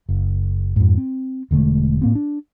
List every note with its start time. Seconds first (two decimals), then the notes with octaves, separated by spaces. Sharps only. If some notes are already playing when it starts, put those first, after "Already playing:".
0.09 F#1
0.76 F2 G#2
0.97 C4
1.51 E1 D3 G#3 A3
2.02 A2 A#3 C4
2.15 D4